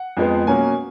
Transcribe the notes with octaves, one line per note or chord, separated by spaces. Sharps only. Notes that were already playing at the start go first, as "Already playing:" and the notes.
Already playing: F#5
F2 F3 G#3 B3
B2 F#3 A#3 C#4 G#5